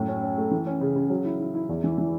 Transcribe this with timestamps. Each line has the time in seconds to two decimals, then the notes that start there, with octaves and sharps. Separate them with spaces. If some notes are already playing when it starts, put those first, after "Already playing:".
Already playing: F#2 A2
0.08 C#4
0.23 C#4
0.38 A3
0.51 E3
0.67 C#4
0.81 C#3
0.96 C#3
1.10 F#3
1.25 E4
1.40 E4
1.55 E4
1.69 E2
1.84 E3
1.98 E3